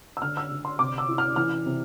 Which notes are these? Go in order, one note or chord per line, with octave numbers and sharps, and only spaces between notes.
E6
D3 F6
E6
D3
C6
C3 D6
E6
E4
F6
E3 F6
C3